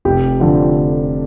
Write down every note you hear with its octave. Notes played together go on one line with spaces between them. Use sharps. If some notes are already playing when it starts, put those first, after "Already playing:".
F1 G4
F2 D3